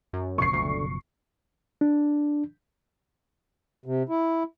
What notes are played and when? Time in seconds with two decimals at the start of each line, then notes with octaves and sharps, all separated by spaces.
0.13 F#2
0.38 F#1 B2 F3 C#6 C7
0.53 D2
1.81 D4
3.85 C3
4.09 E4